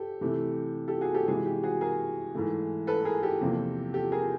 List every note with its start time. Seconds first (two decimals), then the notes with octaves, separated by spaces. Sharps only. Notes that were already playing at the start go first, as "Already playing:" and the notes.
Already playing: G4 A4
0.21 C3 E3 A3
0.88 G4 A4
1.01 F#4 G#4
1.14 G4 A4
1.28 C3 E3 G#3 F#4 G#4
1.46 G4
1.63 F#4 G#4
1.81 G#4 A#4
2.35 G#2 E3 A3
2.87 A4 B4
3.05 G#4 A#4
3.23 G4 A4
3.41 E2 C3 F3 A#3
3.94 G4 A4
4.12 G#4 A#4